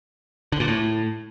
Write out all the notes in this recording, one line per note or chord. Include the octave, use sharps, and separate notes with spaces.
D3
A#2
A2